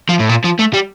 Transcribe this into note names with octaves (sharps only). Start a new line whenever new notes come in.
F3
A2
A#2
F3
A3
G3